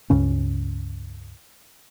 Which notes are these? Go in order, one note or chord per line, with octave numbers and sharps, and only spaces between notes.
C#2 G2 C#3 C#4